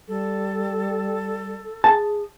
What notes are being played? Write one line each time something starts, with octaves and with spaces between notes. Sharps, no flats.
G3 A4
G#4 A5